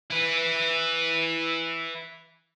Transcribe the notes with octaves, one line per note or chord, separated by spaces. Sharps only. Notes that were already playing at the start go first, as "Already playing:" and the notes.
E4 B4